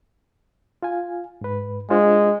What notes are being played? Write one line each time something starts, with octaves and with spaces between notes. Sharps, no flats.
F4 F5 G#5
G#2 B4
G#3 D4 F4 C5